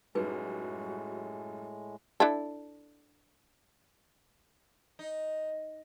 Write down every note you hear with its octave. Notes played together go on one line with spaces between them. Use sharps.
F#2 A2 G3 G#3 D#4 F#4 G#4 B4
D4 E4 A4
D#4